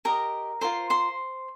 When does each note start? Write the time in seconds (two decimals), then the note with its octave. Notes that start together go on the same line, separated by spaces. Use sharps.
0.05 G4 A#4 D#5 A#5
0.61 F4 A#4 C5 C6
0.90 C5 C6